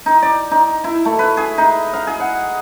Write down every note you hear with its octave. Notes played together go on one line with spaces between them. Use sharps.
D#4
D5
D#4
E4
A3
B4
G#4
D#4
F5
G#4
F#5